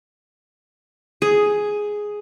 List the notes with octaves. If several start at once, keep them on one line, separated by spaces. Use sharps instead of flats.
G#4